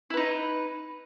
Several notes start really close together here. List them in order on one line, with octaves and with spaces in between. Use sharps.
E4 B4 D#4